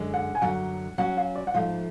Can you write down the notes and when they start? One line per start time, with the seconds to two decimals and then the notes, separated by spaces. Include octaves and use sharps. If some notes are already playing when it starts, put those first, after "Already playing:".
Already playing: F#2 D3 G#3
0.14 F#5
0.35 G#5
0.42 F#2 D3 F#3 F#5
0.98 F#3 C#4 F#4 F#5
1.17 F5
1.36 D5
1.47 F#5
1.54 G#2 F3 A3 F5